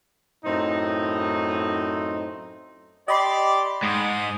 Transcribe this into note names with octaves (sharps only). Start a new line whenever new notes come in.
F#2 A2 C4 D#4
G4 D5 D#5 B5 C6
G#2 D#6